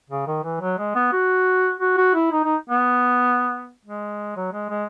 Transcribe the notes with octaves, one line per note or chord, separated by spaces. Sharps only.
C#3
D#3
E3
F#3
G#3
B3
F#4
F#4
F#4
E4
D#4
D#4
B3
G#3
F#3
G#3
G#3